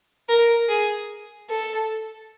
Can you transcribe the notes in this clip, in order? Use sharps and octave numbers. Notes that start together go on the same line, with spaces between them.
A#4
G#4
A4